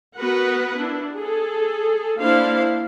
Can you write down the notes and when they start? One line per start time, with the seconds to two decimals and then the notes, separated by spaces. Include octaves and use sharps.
0.19 B3 F#4 A#4 B4 F#5
0.77 D4 E4
1.16 G#4 A4
2.21 A#3 D4 E4 C5 F5